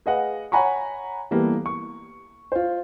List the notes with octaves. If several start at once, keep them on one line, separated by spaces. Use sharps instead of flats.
G#4 B4 D#5 F5 F#5
C#5 F#5 G#5 A#5 B5 C#6
E3 G3 A#3 B3 G4 A4
C#6
F4 C5